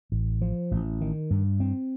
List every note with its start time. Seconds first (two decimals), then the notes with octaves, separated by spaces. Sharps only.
0.12 A1
0.41 F3
0.71 A1
1.01 D#3
1.30 G2
1.60 C4